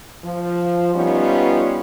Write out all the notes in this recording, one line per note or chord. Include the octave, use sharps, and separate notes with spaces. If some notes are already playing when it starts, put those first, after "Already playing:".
F3
G3 B3 C#4 D#4 F4